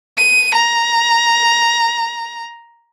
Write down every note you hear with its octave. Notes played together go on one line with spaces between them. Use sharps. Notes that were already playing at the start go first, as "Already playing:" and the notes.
D#7
A#5